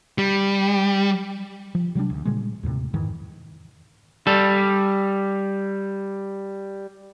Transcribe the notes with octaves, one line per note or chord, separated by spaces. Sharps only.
G3
F3
C3 F#3 G3 D4
D2
A#2 C#3 G3 G#3
D#2 A2 C3
F2 G#2 D#3 E3
G3 A4